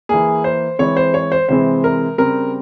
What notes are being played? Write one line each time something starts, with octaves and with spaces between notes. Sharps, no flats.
E3 A#3 G#4
C5
E3 G#3 C4 C#5
C5
C#5
C5
C3 E3 G#3 C4 C5
A#4
C#3 G3 C4 A#4